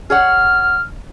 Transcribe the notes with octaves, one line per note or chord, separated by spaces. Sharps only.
G#4 C#5 F#5 F6